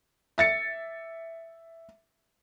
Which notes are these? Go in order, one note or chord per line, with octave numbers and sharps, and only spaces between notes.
E5 A6 C#7